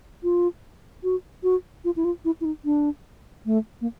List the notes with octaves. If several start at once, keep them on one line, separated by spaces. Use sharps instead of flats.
F4
F#4
F#4
F4
E4
F4
E4
E4
D#4
D4
A3
A#3